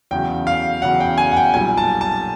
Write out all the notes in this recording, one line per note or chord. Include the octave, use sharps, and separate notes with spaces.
E2 C#3 F#3 G5
F5
E2 C#3 F#3 F#5
G5
G#5
F#5
G5
B1 A#2 G3 G#5
A5
A5